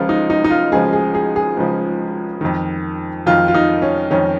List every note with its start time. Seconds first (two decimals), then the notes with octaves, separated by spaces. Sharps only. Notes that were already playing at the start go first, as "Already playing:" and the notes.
Already playing: C#2 C#3 F3 F4
0.09 D#4
0.30 D#4
0.44 D#4
0.50 F4
0.72 C#2 C#3 F3 G#4
0.93 G#4
1.15 G#4
1.36 G#4
1.57 C#2 C#3 F3
2.41 F2 D#3
3.26 F2 D#3 F4
3.48 F4
3.54 D#4
3.82 C#4
4.10 F2 D#3 C#4